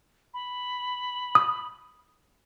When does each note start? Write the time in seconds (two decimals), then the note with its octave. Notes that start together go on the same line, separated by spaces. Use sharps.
0.34 B5
1.35 D#6